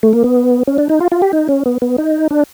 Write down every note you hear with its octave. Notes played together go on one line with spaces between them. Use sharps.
A3
A#3
B3
C#4
D4
D#4
F4
F4
G4
D#4
C#4
B3
B3
D#4
D4